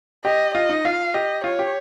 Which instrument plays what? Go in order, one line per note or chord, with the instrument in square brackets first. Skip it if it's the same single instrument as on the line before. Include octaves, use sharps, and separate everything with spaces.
[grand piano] G4 [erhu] D#5
[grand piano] F4 [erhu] D#5
[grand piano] D#4
[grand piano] F4 [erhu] F5
[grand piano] G4 [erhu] D#5
[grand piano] F4 [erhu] C#5
[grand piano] G4